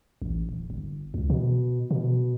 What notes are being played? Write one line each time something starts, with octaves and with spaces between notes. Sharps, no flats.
A1
D1
G1
C#2
B2
B2